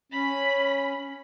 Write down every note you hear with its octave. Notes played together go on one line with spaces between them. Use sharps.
C#4 B5